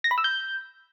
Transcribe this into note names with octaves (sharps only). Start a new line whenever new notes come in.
A#6
B5
E6
G6